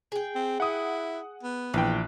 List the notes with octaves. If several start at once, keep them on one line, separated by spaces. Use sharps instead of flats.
G#4 G5
C4
E4 F#5 D#6
B3
A#1 E3 B4 G5